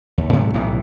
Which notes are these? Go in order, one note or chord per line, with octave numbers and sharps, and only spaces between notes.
D#2
G#2 C3 F#3 A3
B1 A2 C3 E3